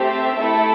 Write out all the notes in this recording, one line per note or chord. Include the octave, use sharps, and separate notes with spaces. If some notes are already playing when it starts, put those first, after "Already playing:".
Already playing: A3 C4 G4 E5
A3 E4 A4